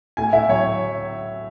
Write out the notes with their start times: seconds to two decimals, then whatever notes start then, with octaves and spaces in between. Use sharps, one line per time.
0.17 A2 G#5
0.32 A2 E5
0.49 F#3 C#5